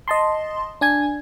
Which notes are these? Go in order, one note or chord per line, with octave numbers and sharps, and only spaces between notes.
D#5 A5 C6
D4 G#5 G#6